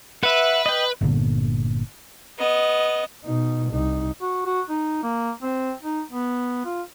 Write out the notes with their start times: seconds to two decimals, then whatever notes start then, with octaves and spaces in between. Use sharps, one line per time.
0.23 B4 E5 F#5
0.66 D#5 G5
1.01 G1 A#2 D3 B3
2.39 B3 D#5
3.25 B2 D#4
3.70 C2 D#4
4.21 F#4
4.46 F#4
4.69 D#4
5.03 A#3
5.42 C4
5.83 D#4
6.12 B3
6.65 F4